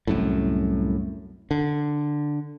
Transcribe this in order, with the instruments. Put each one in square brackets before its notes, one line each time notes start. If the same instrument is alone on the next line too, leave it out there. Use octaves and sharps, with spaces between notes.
[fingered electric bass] C2 F#2 A2
D3